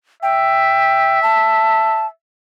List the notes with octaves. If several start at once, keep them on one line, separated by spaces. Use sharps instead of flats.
E5 G5
A5